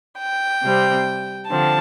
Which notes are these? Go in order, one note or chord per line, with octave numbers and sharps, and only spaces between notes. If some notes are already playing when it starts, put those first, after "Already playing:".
G5
C3 G3 C4
D3 F3 C4 A5